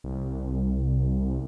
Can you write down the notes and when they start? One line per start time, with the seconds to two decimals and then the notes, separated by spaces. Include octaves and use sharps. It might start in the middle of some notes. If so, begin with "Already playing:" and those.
0.04 C2